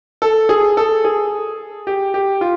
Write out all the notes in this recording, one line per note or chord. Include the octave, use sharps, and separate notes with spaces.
A4
G#4
A4
G#4
G4
G4
F4